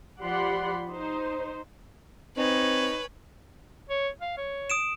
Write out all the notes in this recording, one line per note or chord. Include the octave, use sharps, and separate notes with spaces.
F3 G4 D5 F#5 B5 C6
D#4 C5
C4 D#4 B4 C#5 G#5
C#5
F5
C#5
D#6 D7 E7